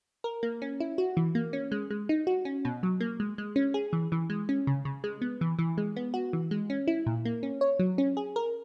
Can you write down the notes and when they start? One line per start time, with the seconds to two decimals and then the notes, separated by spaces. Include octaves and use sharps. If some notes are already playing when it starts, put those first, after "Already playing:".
0.24 A#4
0.43 A#3
0.62 C#4
0.80 E4
0.98 F#4
1.17 E3
1.35 A#3
1.53 C#4
1.72 G#3
1.90 G#3
2.09 D#4
2.27 F#4
2.45 C#4
2.65 B2
2.83 F#3
3.00 A#3
3.20 G#3
3.38 G#3
3.56 C#4
3.74 G#4
3.93 E3
4.12 E3
4.30 G#3
4.49 C#4
4.67 C#3
4.85 C#3
5.04 G#3
5.22 B3
5.41 E3
5.59 E3
5.78 G#3
5.96 B3
6.14 F#4
6.33 E3
6.51 G#3
6.70 C#4
6.87 E4
7.06 A#2
7.25 A#3
7.43 C#4
7.61 C#5
7.79 F#3
7.98 C#4
8.17 G#4
8.36 A#4